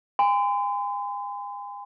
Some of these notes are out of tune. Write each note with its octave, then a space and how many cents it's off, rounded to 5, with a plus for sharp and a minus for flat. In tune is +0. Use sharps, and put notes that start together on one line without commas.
G#5 -40 C6 -40